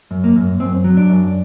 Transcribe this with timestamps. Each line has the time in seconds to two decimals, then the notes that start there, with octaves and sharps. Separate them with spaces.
0.11 F#2
0.24 A#3
0.36 F#2
0.60 F#2 C4
0.84 F#3
0.97 D4
1.09 F#2